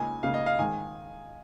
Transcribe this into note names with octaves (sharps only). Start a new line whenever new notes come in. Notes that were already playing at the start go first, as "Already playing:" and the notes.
Already playing: C#2 C#3 A#3 D#4 G#5
C#2 C#3 A#3 D#4 F5
D#5
F5
G#2 D#3 G#3 G#5